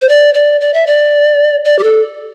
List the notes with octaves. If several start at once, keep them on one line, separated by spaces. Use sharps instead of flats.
C5
D5
D5
D5
E5
D5
D5
G4
A4